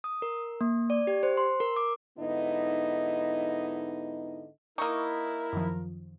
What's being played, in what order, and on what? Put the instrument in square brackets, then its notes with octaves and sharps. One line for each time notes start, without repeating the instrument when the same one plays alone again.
[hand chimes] D#6
A#4
A#3
D5
G4
C5
C6
A#4
D6
[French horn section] G#2 D3 B3 D#4 E4 D#5
[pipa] A#3 D#4 [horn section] E4 [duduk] A#4 [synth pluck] C#6 D#6
[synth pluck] F#2 D#3 F3